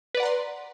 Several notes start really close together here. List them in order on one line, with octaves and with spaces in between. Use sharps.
B4 D5 F#5 A#5 C6